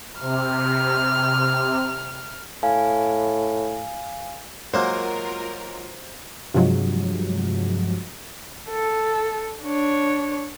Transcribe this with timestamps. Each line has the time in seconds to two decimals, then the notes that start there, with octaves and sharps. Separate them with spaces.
0.20 C3 F6
2.63 A2 F5 G#5
4.74 F#3 G#3 A#3 F4 F#4 A#4 C5
6.54 G2 C3 F3 F#3 G#3
8.70 A4
9.64 D4 C#5